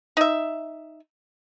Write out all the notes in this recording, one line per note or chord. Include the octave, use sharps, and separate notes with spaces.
D#4 E5